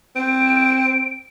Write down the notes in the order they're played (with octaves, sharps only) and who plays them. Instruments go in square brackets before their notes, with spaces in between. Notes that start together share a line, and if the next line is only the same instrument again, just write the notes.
[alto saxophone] C4 [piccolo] D7